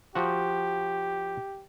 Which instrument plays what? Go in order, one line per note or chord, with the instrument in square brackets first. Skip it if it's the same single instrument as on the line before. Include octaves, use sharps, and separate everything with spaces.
[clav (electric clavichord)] F3 F#4 [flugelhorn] G4